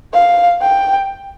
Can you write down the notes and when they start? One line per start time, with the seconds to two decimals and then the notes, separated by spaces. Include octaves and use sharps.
0.13 F5
0.61 G5